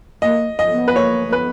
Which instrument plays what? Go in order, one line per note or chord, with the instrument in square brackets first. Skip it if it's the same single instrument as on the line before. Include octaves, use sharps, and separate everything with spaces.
[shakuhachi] A#3 [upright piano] D#5
[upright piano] D#5
[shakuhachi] B3
[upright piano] B4
[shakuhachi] A#3 [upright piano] C#5
[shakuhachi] A#3
[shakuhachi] B3 [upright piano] B4